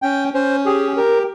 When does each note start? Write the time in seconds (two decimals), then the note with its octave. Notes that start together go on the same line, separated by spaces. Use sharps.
0.02 C#4 G5
0.33 C#4 C5
0.66 G4 G#4
0.96 G4 A#4